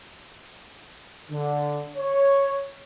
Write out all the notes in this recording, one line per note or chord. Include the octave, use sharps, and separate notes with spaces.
D3
C#5